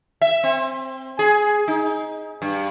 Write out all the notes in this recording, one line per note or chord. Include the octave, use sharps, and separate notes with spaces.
E5
C4
G#4
D#4
G2